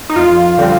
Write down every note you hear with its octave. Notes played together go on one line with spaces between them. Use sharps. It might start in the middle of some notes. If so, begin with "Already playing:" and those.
D#4
F2 F4
D3 G3 C4